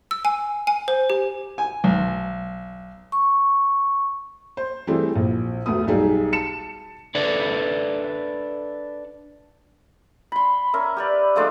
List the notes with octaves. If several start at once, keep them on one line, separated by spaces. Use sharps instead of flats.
E6
G#5
G#5
C5
G4
G#5
B1
C#6
C5
E3 G3 A3 C4 E4 G#4
A#1
E1 D2 A3 B3 D#6
B1 G3 D#4 G#4
A5 C#7 E7
D4 A4 B4 D5 E5
B5 C6
C#4 A#4 E5
G4 B4 D5
F3 G#3 A3 D4